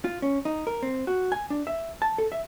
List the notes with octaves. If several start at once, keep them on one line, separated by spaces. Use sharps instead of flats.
F4
C#4
D#4
A#4
C4
F#4
G#5
D4
E5
A5
A4
E5